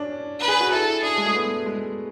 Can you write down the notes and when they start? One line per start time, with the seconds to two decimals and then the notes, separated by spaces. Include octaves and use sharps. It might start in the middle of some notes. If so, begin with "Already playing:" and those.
Already playing: C#4 D4
0.41 B4
0.48 G#4
0.61 F#4
0.72 E4 A4
1.03 D4 G#4
1.18 G#3
1.26 A3
1.35 B3
1.66 G#3